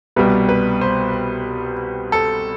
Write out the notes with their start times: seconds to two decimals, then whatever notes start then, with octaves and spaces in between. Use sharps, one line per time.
0.16 C2 B2 G3 B4
0.49 B4
0.81 C5
2.12 A4